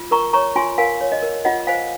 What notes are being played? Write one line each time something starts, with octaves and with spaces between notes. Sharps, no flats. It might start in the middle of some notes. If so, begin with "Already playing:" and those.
Already playing: F4
A#4 A#5 C#6
C#5 A#5 C#6
F4 G#5 C6
A#4 F5 G#5
C#5
D#5
A#4
F4 D#5 F#5
C5 F5 G#5